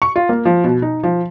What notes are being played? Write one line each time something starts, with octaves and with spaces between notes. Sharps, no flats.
C#6
F4
A#3
F3
B2
D#4
F3